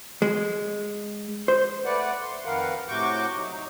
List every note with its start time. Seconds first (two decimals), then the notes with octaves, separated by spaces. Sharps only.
0.22 G#3
1.48 C5
1.85 A3 B4 D5 F#5
2.21 C6
2.45 F2 D#3 A#4 B4 F5 F#5
2.88 A2 C3 F#4 C#6 D6 G6
3.36 F#3 D#4